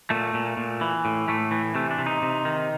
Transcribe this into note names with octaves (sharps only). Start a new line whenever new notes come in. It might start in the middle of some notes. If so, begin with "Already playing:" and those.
A#2 A3
A#2
A#2
E3
A2
A2 A3
E3
C3 A3
D4
C3
D#4
C3
D#3